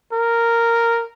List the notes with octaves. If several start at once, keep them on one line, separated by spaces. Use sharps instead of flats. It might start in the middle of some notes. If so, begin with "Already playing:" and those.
A#4